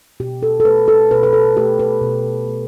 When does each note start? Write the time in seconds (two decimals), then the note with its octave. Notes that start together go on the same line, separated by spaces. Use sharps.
0.20 B2 G4
0.43 A4
0.60 A4
0.65 A3 B4
0.88 A4
1.11 B2 B4
1.23 B4
1.33 A4
1.57 A3 G4
1.79 B4
2.02 B2
2.47 A3